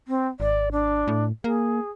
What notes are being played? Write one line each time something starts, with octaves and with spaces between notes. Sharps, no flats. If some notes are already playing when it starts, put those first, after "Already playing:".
C4
G#1 D5
D4
A2
A#3 G#4